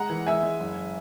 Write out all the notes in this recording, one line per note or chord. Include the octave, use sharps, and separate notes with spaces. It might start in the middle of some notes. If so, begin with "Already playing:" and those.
Already playing: G#3 F#5 A#5
E3
G#3 E5 G#5
G#3
F#1